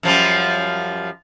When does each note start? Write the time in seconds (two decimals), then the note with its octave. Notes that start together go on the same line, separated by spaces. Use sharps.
0.03 F#2 F3 G3